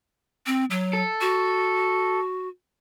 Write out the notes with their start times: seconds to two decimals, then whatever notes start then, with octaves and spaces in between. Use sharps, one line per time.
0.47 C4
0.71 F#3
0.93 A4
1.21 F#4